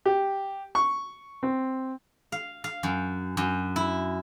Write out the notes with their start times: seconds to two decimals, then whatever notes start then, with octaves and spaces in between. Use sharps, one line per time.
0.06 G4
0.75 C#6
1.43 C4
2.32 F5
2.64 F5
2.83 F#2
3.37 F#2
3.76 E4